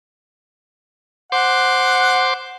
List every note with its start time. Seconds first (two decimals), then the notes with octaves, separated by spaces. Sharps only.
1.32 C5 F#5 C6 D6